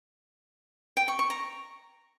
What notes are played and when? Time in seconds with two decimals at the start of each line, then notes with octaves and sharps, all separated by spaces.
0.97 G5
1.08 C#6
1.19 C#6
1.30 A#5